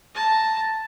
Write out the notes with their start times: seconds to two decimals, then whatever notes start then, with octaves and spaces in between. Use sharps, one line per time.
0.15 A5 A#5